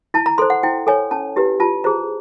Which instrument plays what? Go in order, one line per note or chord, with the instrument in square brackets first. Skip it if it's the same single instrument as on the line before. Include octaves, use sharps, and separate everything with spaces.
[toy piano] E4 A5
A#5
A4 C5 C6
F#5
E4 G5
A4 C#5 G#5
C#4 A5
E4 G4 B4
F4 A5
G#4 C5 A#5